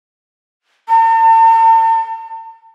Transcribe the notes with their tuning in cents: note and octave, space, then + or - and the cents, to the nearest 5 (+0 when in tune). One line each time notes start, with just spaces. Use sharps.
A5 +45